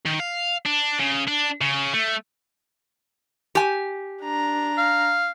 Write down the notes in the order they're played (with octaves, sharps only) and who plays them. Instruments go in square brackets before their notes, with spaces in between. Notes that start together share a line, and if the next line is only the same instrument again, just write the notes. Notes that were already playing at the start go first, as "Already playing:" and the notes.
[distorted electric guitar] D#3
F5
D4
C#3
D4
C#3
A3
[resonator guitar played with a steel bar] G4 G#5
[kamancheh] D4 A#5
[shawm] F5